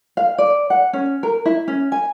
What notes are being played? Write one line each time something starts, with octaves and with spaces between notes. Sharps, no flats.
F5
D5
F#5
C#4
A#4
E4
C#4
G#5